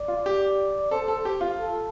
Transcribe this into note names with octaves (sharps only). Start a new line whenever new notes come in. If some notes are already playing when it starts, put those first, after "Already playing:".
Already playing: D5
F4
G4
A4 C5
A4
G4
F4
A4